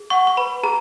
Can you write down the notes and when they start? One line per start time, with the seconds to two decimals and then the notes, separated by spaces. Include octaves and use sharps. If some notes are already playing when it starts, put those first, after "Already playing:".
Already playing: G#4
0.10 F#5 C#6
0.27 C#6
0.37 B4 B5
0.63 G#4 A#5